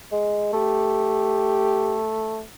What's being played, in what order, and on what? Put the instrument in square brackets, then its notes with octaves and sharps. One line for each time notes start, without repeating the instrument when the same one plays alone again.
[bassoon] G#3
[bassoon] A3 [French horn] G4